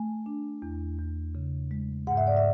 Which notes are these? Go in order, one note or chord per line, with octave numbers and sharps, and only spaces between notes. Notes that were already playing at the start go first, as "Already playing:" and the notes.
Already playing: A3 G#5
D4
E2
E2
C#3
G#3
G#2 F#5
E5
D5
E5